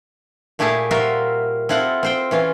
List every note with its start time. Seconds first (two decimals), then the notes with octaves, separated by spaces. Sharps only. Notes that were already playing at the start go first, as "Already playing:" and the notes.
0.59 A#2 A3 E4 G4 G#4 A5
0.91 G3 F4 F#4 A#4 C5 E5
1.69 C4 E4 F4 A4 F#5
2.03 C4 C5 G5
2.31 E3 C#4 F4